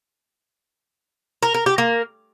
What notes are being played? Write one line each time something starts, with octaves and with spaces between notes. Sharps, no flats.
A#4
A#4
G4
A#3